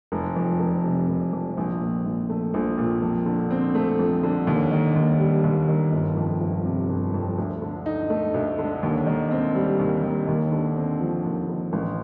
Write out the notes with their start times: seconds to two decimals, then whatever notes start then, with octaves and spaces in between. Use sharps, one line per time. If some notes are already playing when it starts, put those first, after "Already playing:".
0.12 F1
0.36 F2
0.60 F1
0.84 C3
1.08 F1
1.33 F2
1.57 A#1
1.81 A#2
2.05 A#1
2.30 A3
2.54 A#1
2.78 A#2
3.02 F2
3.26 D3
3.51 C4
3.75 A3
3.99 F2
4.23 D3
4.47 D#2
4.71 D#3
4.95 D#2
5.19 G3
5.44 D#2
5.69 D#3
5.92 G1
6.16 F2
6.41 G1
6.65 C3
6.89 G1
7.14 F2
7.38 D2
7.62 D3
7.86 D#4
8.10 A3
8.34 D2
8.59 D3
8.83 D#2
9.07 D#3
9.31 C4
9.55 G3
9.79 D#2
10.03 D#3
10.28 D#2
10.52 D3
10.76 C4
11.00 F3
11.25 D#2
11.49 D3
11.73 A1